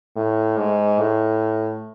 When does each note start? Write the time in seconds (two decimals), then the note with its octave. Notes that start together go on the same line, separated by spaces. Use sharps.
0.16 A2
0.58 G#2
0.99 A2